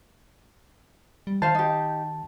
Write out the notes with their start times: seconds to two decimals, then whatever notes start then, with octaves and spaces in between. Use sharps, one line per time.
1.27 G3
1.42 D#3 C5 F5 A5
1.55 D#4 G4